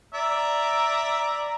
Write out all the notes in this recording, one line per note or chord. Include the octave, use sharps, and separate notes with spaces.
D5 E5 A#5